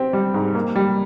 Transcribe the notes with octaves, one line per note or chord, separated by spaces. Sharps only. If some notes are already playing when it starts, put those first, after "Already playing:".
Already playing: C4 G4
G3
G#2
A#3
G3